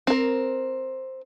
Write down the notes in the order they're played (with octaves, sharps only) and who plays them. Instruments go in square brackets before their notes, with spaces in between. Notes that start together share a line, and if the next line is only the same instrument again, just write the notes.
[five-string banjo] C4 A#4